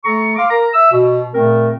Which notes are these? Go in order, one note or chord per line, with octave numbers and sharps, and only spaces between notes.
A3 A4 A#5 C#6
F5 C6 D6
A#4 A#5
E5 E6
B2
A#2 C#3 A3 C4 A#4